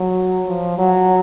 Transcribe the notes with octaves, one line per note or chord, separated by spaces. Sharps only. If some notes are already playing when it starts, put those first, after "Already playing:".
Already playing: F#3
F3
F#3